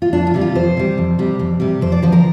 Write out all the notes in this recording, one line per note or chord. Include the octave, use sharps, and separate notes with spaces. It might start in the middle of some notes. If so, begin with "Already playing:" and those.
F4
F2 D4
F4
C3 G3
F4
F2 C5
C3 G3
F2
C3 G3
F2
C3 G3
F2 C5
D5
D3 F3 C5
A#4